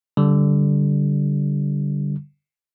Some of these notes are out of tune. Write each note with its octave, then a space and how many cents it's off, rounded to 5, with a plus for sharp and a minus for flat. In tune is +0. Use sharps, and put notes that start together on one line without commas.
D3 -20 G3 -10